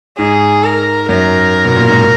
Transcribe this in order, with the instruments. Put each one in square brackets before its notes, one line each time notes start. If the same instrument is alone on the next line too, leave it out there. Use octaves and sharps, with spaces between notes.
[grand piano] G#2 [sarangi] G#4
[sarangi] A#4
[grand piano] F#2 [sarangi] A#4
[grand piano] B2
A#2
G#2